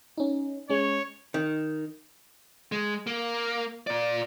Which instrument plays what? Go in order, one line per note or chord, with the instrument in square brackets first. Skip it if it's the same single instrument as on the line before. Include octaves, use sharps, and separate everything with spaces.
[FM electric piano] C#4 D#4
[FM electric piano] G#3 C#4 [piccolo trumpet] C#5
[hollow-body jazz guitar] D#3
[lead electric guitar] G#3
A#3
A#2 D5